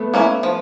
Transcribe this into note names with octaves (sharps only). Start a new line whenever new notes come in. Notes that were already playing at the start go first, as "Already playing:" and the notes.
Already playing: A3 B3
A#3 C#4 E4
F3